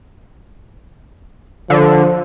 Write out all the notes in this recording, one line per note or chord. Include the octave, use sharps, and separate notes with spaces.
D3 F3